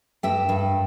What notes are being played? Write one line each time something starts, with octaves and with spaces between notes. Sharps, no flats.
G2 E5 G5
G2